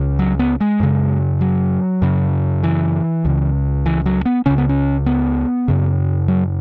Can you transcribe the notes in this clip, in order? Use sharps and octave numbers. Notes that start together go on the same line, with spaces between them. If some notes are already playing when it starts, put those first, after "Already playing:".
Already playing: C#2 C#3
F#3
B3
G#3
F#2 C#3
F#3
F#2 C#3
E3
C#2 C#3
E3
F#3
B3
C#2 C#3 C#4
B3
C#4
B3
F#2 C#3
F#3